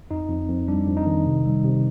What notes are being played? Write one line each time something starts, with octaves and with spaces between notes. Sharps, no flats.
F2 D#4
F2
F2
G3 D4
F2
D#4
D#3
C3
G3
C3